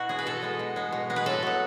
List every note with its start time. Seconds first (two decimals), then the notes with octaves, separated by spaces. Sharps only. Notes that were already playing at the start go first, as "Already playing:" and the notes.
Already playing: B2 E4 F#4
0.09 G#3 B3 G#4
0.19 B4
0.26 B2 A4
0.42 G#3 B3
0.59 B2
0.76 G#3 B3
0.92 B2
1.10 G#3 B3
1.16 B4
1.26 A2 A4
1.43 F#3 B3